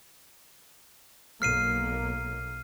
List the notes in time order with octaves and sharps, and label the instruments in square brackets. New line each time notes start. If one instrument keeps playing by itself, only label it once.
[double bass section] B1 A#3 [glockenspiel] F6 C7 D#7